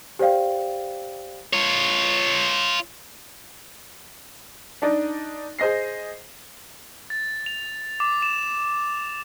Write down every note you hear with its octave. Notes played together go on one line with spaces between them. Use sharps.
G4 C5 D5 F5 G5
F4 C#5
D4 D#4 D5
G#4 C5 D#5 A#6 C7
A6
F7
D6
E7